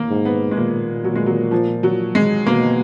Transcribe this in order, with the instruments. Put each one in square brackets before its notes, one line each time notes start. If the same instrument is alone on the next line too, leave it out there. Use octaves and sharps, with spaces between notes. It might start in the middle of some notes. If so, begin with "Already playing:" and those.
Already playing: [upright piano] A#3
[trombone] G#2
[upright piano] B3
G#3
[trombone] A#2 [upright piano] A#3
[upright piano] F#3
G#3
F#3
F3
F#3
G#3
[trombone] B2 [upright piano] A#3